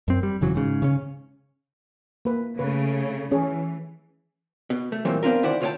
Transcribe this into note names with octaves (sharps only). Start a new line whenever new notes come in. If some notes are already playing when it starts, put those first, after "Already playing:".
F#2 C4
G3
F1 C#3 E3 F#3
G#2 C#3
C#3 C#4
A#3 B4
C#3 A3 B4
E3 C#4 G#4 C#5
B2
A3
A#2 E3 F#3 G3 A#3 C4
B3 C4 D4 F4 A#4
D2 D#3 E4 C5 D5 F#5
D2 F4 C#5 D#5 G5 A5